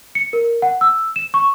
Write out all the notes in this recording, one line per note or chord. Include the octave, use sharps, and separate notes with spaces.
C#7
A#4
F#5
E6
E7
C#6